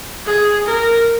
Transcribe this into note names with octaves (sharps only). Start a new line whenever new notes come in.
G#4
A#4